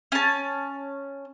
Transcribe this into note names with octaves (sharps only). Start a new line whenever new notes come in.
C#4 A5